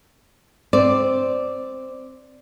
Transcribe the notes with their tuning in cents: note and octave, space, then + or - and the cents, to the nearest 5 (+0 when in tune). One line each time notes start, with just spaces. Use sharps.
C4 +0 D5 +0